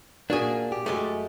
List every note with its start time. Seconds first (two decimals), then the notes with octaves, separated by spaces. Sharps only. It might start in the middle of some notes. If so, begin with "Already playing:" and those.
0.30 A#2 A#3 D4 F#4 G#4
0.72 G4
0.86 F#2 G#3 A3